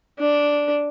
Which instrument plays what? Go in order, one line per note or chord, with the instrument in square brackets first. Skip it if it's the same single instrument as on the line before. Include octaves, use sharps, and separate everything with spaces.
[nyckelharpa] D4